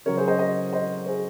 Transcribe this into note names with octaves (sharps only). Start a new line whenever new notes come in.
C#3 F#3 A#4 C#5
G#4 C5
C5 D#5
C5 D#5
C5 D#5
G#4 C5